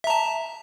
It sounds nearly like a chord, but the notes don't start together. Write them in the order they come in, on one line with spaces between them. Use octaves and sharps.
E5 A#5 A5